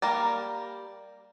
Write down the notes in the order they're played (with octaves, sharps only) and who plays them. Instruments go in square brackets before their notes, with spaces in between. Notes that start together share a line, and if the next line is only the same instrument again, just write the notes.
[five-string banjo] G3 A#3 A#4 D5